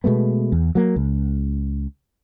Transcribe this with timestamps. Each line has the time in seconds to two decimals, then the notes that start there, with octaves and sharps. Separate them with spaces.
0.04 B2 G#3 A3 B3
0.52 E2
0.75 F#3 A#3
0.96 C#2